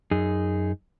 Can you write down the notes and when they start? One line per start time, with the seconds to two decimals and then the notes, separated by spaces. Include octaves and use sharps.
0.11 F#2 D#4 G#4